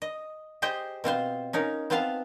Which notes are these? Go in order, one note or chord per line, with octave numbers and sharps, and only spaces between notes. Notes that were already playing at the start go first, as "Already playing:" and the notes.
D#5
G4 G#4 C5 D#5 G5
B2 C4 F4 C5
C#4 D#4 A#4
B3 C4 F4 B4 F5 A5